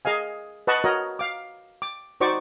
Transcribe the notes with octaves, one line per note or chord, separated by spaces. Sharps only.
G#4 D#5 F5 G#5
B4 D#5 F#5 A5 C#6
F#4 A#4 C#5 D#5
F5 D6
D6
D#4 F#4 C5 D5 C#6 D6